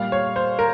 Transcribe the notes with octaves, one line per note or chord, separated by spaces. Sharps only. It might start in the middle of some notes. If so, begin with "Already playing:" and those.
Already playing: A#2 G3 F5
C#5
C5
A#4